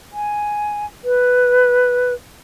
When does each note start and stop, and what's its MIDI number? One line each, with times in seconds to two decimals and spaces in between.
0.13 0.86 80
1.04 2.14 71